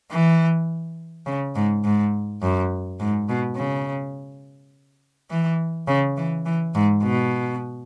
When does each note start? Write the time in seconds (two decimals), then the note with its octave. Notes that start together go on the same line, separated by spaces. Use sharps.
0.11 E3
1.27 C#3
1.55 G#2
1.84 G#2
2.42 F#2
3.00 G#2
3.29 B2
3.57 C#3
5.30 E3
5.88 C#3
6.17 E3
6.46 E3
6.75 G#2
7.03 B2